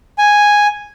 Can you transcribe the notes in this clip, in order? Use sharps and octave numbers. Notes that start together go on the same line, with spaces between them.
G#5